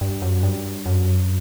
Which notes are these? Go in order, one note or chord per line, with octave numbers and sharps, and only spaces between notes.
G2
F#2
G2
F#2